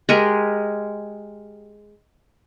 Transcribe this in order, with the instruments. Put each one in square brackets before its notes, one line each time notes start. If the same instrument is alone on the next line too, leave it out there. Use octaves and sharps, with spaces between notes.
[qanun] G#3 G4 G#4 A#4